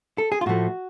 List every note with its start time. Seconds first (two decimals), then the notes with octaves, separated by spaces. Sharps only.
0.18 A4
0.32 G#4
0.41 F4
0.46 A2 F3 A3 F#4